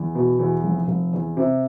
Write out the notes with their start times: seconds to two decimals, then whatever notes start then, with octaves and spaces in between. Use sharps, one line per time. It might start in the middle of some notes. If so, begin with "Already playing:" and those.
Already playing: E2
0.15 B2
0.39 E2
0.64 F1
0.88 F1
1.13 E2
1.37 C3